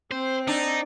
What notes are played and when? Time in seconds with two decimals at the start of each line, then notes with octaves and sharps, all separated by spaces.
0.11 C4 C5
0.47 D4 D#4